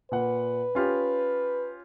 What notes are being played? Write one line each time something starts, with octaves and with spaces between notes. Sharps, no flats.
A#2 B4 F#5
C#4 F4 G4